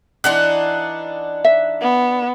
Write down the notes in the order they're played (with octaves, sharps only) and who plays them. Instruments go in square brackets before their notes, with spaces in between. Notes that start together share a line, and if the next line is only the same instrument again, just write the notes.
[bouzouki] E3 D4 D#4 [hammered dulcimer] F#5 C6
[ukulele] E5
[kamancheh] B3